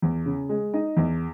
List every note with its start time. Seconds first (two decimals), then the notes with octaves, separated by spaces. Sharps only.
0.02 E2
0.25 C#3
0.49 G#3
0.74 D#4
0.97 E2